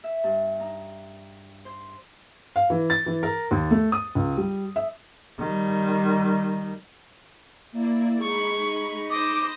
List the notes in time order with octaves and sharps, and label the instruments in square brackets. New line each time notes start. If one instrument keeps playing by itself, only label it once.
[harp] E5
G2
D#4
C5
[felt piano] F5
E3
A6
E3
A#4
D#2
A3
D#6
C#2
G3
E5
[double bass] D#3 G3
[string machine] A#3 E4 D5
[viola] G#3 C#6 [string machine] D#4 B5
[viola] C5 D#5 [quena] D6